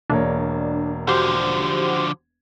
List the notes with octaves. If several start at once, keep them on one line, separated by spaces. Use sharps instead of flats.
E1 A#3 D4 C#5
D3 F3 F#4 G4 C5